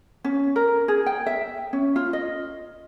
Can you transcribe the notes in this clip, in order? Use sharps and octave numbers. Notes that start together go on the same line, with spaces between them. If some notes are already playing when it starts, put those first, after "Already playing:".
C#4
A#4
G#4
G5
E5
C#4
F4
D#5